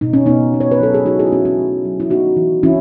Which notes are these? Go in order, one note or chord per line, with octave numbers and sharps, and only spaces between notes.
B2 D#4
C#4
B2 B3 D#4
B3
C#5
B4
F#3 A4
G#4
B2 D#4 F#4
E4 G#4
F#4
B2 C#4 E4
C#4 E4
A3
F#3
E4
B3 D#4 F#4
E3
E3 C#4 E4